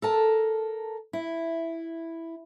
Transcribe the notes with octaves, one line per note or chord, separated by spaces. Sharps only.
A4 A#4 A5
E4